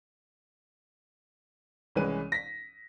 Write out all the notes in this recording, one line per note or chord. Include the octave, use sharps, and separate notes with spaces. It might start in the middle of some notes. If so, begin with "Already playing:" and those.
C2 E3 G#3 C#4 B4 D#7
A#6 B6